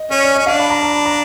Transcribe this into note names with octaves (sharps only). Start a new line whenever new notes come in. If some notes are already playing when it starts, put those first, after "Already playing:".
Already playing: D#5
C#4 C#5
D5
C#4 D#5
D4 F5
B5
A#5
A#5
A5
A#5